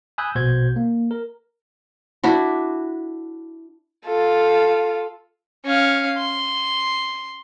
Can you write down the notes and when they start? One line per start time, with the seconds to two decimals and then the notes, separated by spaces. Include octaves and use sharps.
0.18 G#5 B5 D#6 E6 F#6 G6
0.35 A#1 B2 F#4 C5 G6 G#6
0.76 A#3
1.11 A#4
2.24 D4 E4 F#4
4.06 F4 A4
5.65 C#4 F5
6.18 C6